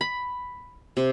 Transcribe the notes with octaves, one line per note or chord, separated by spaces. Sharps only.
B5
C3